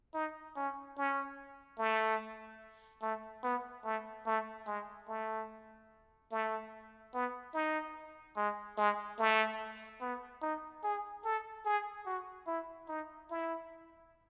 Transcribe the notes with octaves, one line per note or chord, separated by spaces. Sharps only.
D#4
C#4
C#4
A3
A3
B3
A3
A3
G#3
A3
A3
B3
D#4
G#3
G#3
A3
B3
D#4
G#4
A4
G#4
F#4
E4
D#4
E4